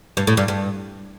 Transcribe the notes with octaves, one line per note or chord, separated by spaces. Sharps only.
G2
A2
G2
G2